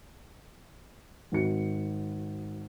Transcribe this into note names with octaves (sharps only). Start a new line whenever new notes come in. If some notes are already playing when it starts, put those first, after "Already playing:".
G#1 F#4 C#7